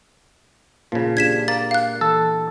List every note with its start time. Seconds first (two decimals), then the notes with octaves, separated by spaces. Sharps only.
0.92 A#2 C#3 F3 A#3 A#4
1.17 D4 G4 G#4 G#6 B6 E7
1.48 A#3 A6
1.71 F5 F#6
2.01 E3 A4